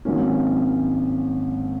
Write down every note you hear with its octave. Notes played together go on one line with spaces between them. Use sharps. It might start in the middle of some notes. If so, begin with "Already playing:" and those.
G#1 G#2 F#3 A#3 C#4